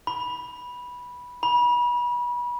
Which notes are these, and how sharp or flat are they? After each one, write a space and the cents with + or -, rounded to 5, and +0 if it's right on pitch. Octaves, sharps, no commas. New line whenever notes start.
B5 -10
B5 -30